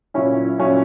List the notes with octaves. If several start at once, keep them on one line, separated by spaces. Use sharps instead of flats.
A#2 F#3 C#4 E4
A#2 F#3 C#4 E4